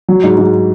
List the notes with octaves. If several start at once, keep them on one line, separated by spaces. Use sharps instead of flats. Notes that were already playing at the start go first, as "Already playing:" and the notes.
F#3
G#2
G#2